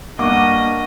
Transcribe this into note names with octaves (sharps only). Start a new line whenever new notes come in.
G2 A#3 D#5 F#5 C#6 D6 F#6